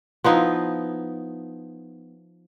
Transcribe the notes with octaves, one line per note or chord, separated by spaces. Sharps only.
F3 B3 D#4 E4